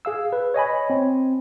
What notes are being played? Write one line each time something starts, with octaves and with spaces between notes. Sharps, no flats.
G#4 F5 E6
B4
C#5 D#5 G#5 B5
C4